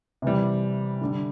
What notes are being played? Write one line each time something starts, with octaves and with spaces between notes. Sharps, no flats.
C3 E3 G3
D3 G3